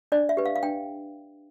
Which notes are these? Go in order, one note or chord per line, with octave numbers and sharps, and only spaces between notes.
D4 D5
E5
G4 B4
F5
F5
D4 G5